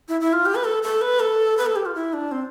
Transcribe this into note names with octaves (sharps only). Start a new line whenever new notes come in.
E4
E4
F4
G4
B4
A4
A4
B4
A4
B4
A4
G4
F4
E4
D4
C4